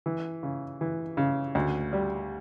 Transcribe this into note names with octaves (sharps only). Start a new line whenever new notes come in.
E3
C#3
E3
C#3
D2
G3